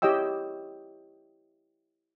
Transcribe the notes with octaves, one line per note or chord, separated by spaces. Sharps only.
E4 G4 C#5 D#5 G5 E6